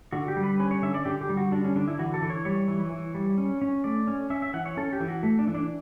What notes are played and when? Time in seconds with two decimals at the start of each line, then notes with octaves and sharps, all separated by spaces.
0.12 D3 F#4
0.28 G4
0.37 G3
0.43 B4
0.60 C#4 B4
0.71 C#5
0.82 D3 E5
0.94 D5
1.05 D3 G4
1.21 G4
1.29 G3
1.37 F#4
1.52 D3 D4
1.64 C#4
1.76 D3 D4
1.88 E4
1.99 E3 F#4
2.14 A4
2.22 E3
2.30 C#5
2.45 G3 C#5
2.68 E3
2.92 E3
3.14 G3
3.38 C#4
3.62 C#4
3.84 A3 D5
4.07 C#4
4.30 C#4 E5
4.42 E5
4.54 E3 F#5
4.66 C#5
4.77 C#4 A4
4.93 G4
5.00 E3
5.08 F#4
5.23 A3
5.39 D4
5.47 E3
5.54 D4